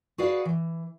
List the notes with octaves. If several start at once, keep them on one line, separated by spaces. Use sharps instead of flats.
F#4 G#4 B4 D5 F5 F#5
E3